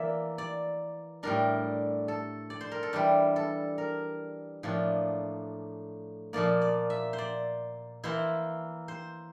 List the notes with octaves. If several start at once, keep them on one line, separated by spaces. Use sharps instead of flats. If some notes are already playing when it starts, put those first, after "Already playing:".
Already playing: E3 A#3 E4 D5 E5
D5
A2 G3 D4 A#4
A4
D5
C5
A#4
A4
E3 G3 D4 G4
A4
A#4
A2 F3 A#3 D4
A#2 F3 A#3 D5
D5
E5
C5
D5
E3 A#3 E4 C5
C5